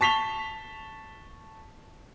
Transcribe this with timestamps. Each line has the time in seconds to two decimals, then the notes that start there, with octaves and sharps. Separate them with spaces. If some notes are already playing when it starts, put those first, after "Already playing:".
0.01 A5 C#6 B6 F7 G7